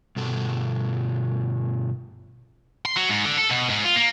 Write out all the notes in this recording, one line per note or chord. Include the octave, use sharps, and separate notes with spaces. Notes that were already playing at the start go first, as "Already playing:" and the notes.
G2 B2 A4
C6
F#3
G#2
D3
A4
B2
G#2
F4
A#3